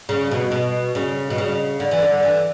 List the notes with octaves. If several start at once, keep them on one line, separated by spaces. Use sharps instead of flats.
C#3
B2
B2
C#3
B2
C#3
D3
E3
D3
E3